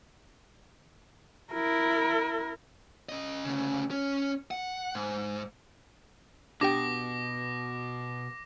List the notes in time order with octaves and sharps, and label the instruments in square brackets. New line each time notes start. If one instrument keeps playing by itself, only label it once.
[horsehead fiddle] E4 A#4
[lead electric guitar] C#4 D#5
D2 C#3
C#4
F#5
G#2
[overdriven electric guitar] B2 [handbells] D4 G4 G5 [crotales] D6 A#6